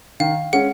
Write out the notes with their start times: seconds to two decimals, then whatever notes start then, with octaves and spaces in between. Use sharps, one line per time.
0.20 D#3 F5
0.53 G#3 C#4 F#5